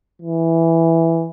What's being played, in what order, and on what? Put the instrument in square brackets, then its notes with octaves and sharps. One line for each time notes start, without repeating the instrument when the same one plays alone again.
[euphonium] E3